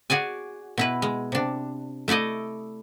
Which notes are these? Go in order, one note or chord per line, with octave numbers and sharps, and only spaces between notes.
F#4 G#4 D5 G#5
B2 E4 B4
G#3
C3 D4
A3 E4 A4 D5 D#5